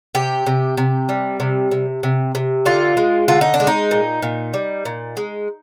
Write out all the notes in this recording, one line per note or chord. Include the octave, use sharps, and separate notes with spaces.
C3 G4
C3
C3
G3
C3
C3
C3
C3
D3 F4
G#3
D3 F4
D#4
D4
G#3
D#4
A#2
A#2
G3
A#2
G#3